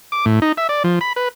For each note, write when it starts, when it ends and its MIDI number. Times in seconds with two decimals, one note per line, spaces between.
0.12 0.25 86
0.26 0.40 45
0.42 0.52 63
0.57 0.67 76
0.69 0.83 74
0.84 0.99 53
1.01 1.13 83
1.16 1.28 71